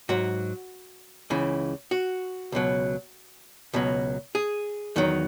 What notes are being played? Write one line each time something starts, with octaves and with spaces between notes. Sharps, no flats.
G#2 F#3 F#4
C#2 C#3 E3
F#4
C#2 B2 F#3
C#2 B2 F#3
G#4
E2 D#3 F#3